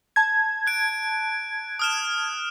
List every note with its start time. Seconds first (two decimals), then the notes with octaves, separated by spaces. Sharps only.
0.16 A5 G#6
0.67 F#6 D7
1.79 D#6 F6 E7